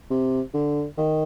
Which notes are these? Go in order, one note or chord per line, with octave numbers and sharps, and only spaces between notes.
C3
D3
D#3